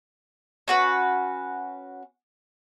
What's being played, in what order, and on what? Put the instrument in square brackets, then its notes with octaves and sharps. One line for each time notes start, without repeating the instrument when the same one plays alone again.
[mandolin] C#4 F#4 B4